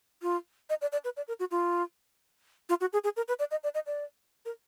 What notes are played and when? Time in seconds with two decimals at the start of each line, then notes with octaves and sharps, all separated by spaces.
0.22 F4
0.70 D#5
0.81 D5
0.92 D5
1.04 B4
1.17 D5
1.28 A#4
1.40 F#4
1.51 F4
2.69 F4
2.81 F#4
2.93 G#4
3.04 G#4
3.17 A#4
3.28 B4
3.39 D5
3.51 D#5
3.64 D5
3.75 D#5
3.86 D5
4.45 A#4